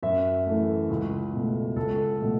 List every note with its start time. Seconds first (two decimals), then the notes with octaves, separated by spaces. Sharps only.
0.03 F#2 E5
0.46 E3 A3
0.90 C#2
1.33 B2 A3
1.76 C#2 A4
2.20 B2 F#3 A3